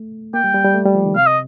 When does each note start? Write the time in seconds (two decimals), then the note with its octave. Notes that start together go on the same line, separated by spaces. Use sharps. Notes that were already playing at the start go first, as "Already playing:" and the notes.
Already playing: A3
0.34 A#3 G5
0.44 G3
0.54 G3
0.65 G3
0.74 A3
0.85 G3
0.95 F3
1.05 D#3
1.16 C3 F5
1.27 D#5